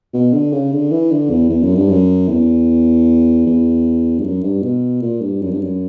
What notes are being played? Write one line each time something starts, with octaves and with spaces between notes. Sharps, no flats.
B2
D3
C#3
D3
E3
D3
E2
E2
F#2
G2
F#2
E2
E2
G2
F#2
G2
B2
A#2
G2
F#2
G2
F#2